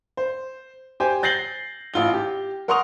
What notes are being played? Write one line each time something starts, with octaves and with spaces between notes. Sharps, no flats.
C5
G4 C5 G5 G#5
G6 A6 A#6 C7 F#7 G7
A1 F4 G7
G4
A#4 F#5 C6 C#6 D#6 F7